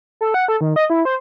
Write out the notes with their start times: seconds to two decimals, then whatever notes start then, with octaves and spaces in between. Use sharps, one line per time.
0.21 A4
0.34 F#5
0.48 A4
0.61 D#3
0.76 D#5
0.90 E4
1.05 C5